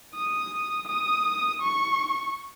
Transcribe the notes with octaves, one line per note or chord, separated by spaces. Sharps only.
D#6
D#6
C#6